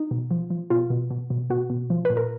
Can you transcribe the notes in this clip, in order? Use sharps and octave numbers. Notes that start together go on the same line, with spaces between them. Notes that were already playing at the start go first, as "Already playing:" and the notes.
Already playing: D#4
B2
F3
F3
B2 F4
B2
B2
B2
B2 F#4
B2
F3
A#2 B4
A#4